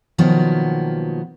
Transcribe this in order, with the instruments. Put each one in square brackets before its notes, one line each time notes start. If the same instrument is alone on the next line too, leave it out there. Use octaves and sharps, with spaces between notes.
[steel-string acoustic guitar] B2 D#3 F3 F#3 A#3 B3